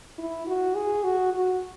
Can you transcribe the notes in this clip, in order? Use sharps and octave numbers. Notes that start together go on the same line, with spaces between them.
E4
F#4
G#4
F#4
F#4